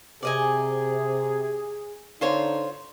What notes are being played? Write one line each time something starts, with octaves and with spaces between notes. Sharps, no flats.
C3 G#4 D5 D#5 G#5
D3 D#4 F4 C5 C#5